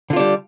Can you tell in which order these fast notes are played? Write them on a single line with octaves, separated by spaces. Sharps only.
D3 F4 D4 G3